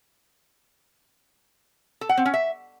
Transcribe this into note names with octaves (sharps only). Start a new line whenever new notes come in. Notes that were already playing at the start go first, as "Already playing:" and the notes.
A4
F#5
C4
C#4
E5